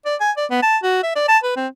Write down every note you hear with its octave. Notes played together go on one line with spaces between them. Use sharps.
D5
G#5
D5
B3
A5
F#4
E5
D5
A5
B4
C4